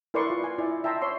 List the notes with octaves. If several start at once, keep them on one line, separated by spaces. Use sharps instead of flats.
E4 A#4 B4 D5 C6 C#6
F4
G#5
E4 D5 D#5
E5 G5 A5 A#5 C6
C5 C#5 E5 C6